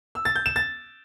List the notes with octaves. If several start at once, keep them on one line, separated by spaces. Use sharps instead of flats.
E6
A6
G6
E7
A6